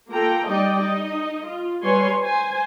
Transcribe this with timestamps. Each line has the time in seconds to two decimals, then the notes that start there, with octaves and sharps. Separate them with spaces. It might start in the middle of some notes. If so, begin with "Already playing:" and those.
0.10 A#3 F4 A4 G5 A#5
0.49 G3 D#4 D5 D#5 G5
0.81 D#4 D#5
1.44 F4
1.83 G3 B4 C#5 G#5 C6
2.22 C5 G#5